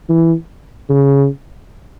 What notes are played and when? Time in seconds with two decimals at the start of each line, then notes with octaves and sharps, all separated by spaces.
0.09 E3
0.89 C#3